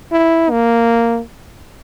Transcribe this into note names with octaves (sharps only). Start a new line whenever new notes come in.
E4
A#3